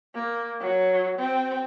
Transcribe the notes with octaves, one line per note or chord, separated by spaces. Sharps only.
A#3
F#3
C4